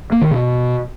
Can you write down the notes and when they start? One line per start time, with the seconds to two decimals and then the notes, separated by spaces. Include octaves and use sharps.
0.12 A#3
0.21 D#3
0.31 B2